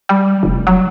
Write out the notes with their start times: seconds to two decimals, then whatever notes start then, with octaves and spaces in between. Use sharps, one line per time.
0.09 G3
0.43 F1
0.67 F#3